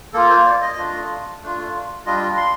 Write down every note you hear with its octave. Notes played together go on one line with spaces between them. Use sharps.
A#3 F4 A4
C5
D5
D#5
A3 D4 F4
A3 D4 F4
G3 D4 F4 D#5
C6